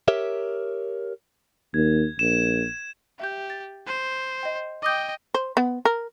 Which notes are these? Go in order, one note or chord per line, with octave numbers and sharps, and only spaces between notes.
G4 A#4 C#5 E5
D#2 G#6
A#1 E7
G4 E5 G6
A6
C5
D#5 G5
D#5 G5 D6 D#6 G6
C5
B3
A#4